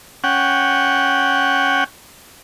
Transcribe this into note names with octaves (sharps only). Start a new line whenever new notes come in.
C#4 F#5 G5